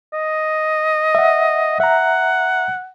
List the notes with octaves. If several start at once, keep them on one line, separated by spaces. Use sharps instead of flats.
D#5
E5 F#5
E5 F#5 A#5